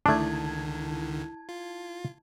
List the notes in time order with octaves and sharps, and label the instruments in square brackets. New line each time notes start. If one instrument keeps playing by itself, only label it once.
[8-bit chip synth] C#2 D3 D#3 [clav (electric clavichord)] A3 D4 [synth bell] E4 A5 G#6
[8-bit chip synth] F4